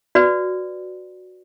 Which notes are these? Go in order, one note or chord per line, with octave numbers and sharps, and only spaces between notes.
F#4 B4 D5